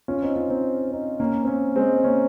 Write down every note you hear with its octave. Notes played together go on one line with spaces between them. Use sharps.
C#4 F4
C4 D#4
C#4 F4
C4 D#4
C4 D#4
A#3 C#4
C4
A#3 C#4
G#3 C4
A#3 C#4